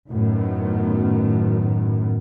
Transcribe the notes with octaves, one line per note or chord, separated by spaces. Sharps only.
F#2 A2 D#3 B3